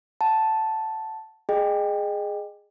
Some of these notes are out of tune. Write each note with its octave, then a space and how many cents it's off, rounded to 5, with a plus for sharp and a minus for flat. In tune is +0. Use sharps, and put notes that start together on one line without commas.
F#5 +0 A5 +0
G#4 +0 D#5 -25 G5 +10